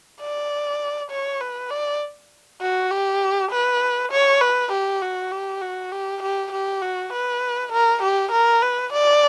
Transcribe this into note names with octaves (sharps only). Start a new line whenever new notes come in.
D5
C#5
B4
D5
F#4
G4
B4
C#5
B4
G4
F#4
G4
F#4
G4
G4
G4
F#4
B4
A#4
G4
A#4
B4
D5